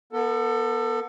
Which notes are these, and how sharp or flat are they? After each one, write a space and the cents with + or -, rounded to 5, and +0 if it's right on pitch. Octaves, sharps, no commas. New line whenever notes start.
B3 -30 A4 +25